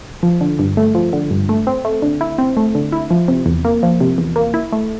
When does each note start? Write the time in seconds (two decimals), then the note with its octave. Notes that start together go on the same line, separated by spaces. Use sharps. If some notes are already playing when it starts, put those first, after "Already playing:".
0.23 F3
0.41 D3
0.59 G2
0.77 A3
0.95 F3
1.13 D3
1.31 G2
1.49 A3
1.67 C4
1.85 A3
2.02 D3
2.21 E4
2.38 C4
2.57 A3
2.75 D3
2.92 E4
3.10 F3
3.28 C3
3.46 E2
3.65 A#3
3.83 F3
4.00 C3
4.18 E2
4.36 A#3
4.54 E4
4.72 A3